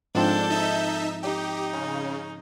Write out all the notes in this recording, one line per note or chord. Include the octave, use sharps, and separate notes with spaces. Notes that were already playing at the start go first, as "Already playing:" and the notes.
G#2 F3 C4 D4 A4 G6
D#4 E5
D#4 G4
C#3